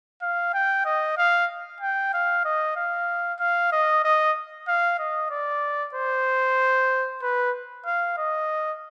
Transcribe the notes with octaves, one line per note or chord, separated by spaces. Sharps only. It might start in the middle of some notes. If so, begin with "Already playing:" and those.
F5
G5
D#5
F5
G5
F5
D#5
F5
F5
D#5
D#5
F5
D#5
D5
C5
B4
F5
D#5